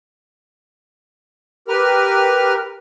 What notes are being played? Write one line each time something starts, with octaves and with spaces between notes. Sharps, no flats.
G4 A#4 B4 F6